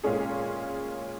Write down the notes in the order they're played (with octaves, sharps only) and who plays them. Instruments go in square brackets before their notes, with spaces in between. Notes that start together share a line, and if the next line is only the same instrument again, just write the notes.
[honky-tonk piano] A#2 G#3 C#4 G#4